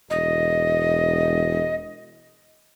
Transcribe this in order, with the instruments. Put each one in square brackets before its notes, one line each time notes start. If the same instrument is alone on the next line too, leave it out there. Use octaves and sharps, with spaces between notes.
[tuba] E1 [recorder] D#5